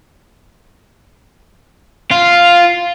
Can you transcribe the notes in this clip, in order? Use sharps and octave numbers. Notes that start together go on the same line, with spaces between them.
F4